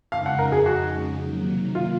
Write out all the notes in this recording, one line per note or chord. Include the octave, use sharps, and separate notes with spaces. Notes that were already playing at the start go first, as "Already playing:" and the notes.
F2 C#3 G#3 D#4 F5
F#5
A#4
G#4
F#4
C3 D#3 F#3 A#3
F4